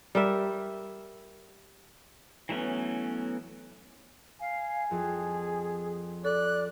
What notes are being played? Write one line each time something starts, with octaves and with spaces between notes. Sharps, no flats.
G3 A#4 E5
E3 F#3 A3 B3 C#4
F5 G#5
F2 G#4
A4 D5 F#6